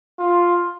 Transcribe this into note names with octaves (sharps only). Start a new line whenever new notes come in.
F4